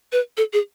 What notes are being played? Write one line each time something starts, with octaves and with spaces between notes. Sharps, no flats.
B4
A4
G#4